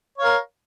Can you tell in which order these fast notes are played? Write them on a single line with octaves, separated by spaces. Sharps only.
C#5 F5 A#4